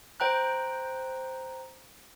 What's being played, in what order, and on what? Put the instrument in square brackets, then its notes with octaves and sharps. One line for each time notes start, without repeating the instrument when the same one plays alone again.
[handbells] C5 G5 A#5 F#6